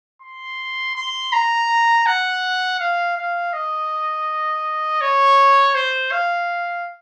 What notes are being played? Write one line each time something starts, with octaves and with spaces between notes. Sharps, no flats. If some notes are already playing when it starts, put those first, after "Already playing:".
C6
C6
A#5
F#5
F5
F5
D#5
C#5
C5
F5